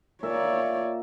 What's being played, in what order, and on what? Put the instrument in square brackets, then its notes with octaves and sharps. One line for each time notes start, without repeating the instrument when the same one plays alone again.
[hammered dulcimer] A#2 A#4 E5 [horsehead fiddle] C#5 D5